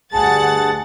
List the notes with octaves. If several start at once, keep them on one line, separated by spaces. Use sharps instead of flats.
D2 G2 G#4 F#5 A5 A6